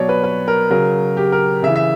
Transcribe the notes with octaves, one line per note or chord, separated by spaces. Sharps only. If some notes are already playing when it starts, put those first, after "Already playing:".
Already playing: B2 F#3 C#5 D5
B4
B4
A#4
C#3 F#3 A#4
G4
A#4
C#3 E5
E3
E5